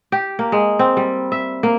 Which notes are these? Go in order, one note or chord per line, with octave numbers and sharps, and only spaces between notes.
G4
A#3
G#3
C4
G3
E5
A#3